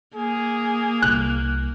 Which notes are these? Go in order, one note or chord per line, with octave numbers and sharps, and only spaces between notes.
A#3 G#4
C2 F#6